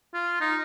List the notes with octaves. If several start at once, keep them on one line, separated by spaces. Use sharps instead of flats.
F4
D#4